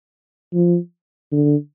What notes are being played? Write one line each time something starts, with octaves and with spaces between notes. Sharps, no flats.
F3
D3